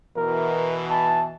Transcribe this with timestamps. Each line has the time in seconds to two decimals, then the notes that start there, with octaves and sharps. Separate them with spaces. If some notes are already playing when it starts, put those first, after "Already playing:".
0.17 B2 E3 A#4
0.90 A5